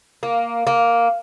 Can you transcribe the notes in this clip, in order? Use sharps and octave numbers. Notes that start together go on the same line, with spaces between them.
A#3
A#3